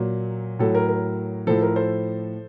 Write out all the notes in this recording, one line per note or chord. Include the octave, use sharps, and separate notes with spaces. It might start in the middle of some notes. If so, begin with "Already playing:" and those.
Already playing: A#2 F#3
A2 F#3 A4
A#4
A#4
A2 F3 A4 C5
A#4
A4 C5